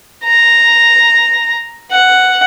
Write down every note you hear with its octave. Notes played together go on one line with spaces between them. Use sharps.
A#5
F#5